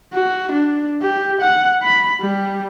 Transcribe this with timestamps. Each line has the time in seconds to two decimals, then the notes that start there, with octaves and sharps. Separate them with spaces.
0.14 F#4
0.52 D4
1.02 G4
1.41 F#5
1.83 B5
2.21 G3